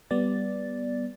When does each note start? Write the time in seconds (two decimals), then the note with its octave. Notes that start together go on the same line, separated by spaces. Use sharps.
0.11 G3 B3 D5 A6